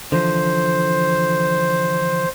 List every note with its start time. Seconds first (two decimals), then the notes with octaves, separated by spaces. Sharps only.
0.12 D3 E3 F3 C5